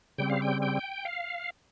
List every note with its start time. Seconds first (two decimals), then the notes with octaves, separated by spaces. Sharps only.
0.18 C#3 G3 C4 G5
0.30 F5
0.42 G5
0.62 G5
1.05 F5